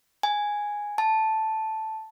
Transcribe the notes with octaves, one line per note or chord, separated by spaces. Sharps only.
G#5
A5